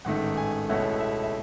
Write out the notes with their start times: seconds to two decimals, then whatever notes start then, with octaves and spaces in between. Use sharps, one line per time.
0.05 A1 G#2 D#3 A3 F#5
0.37 G#5
0.69 C#2 B2 A3 C#4 E4 F#5
1.00 E5
1.23 E5